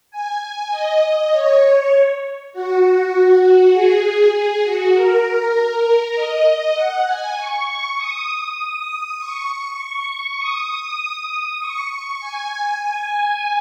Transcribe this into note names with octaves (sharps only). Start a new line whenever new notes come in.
G#5
D#5
C#5
F#4
G#4
G#4
F#4
A#4
D#5
F#5
G#5
C#6
C#6
D#6
C#6
D#6
C#6
C#6
G#5
G#5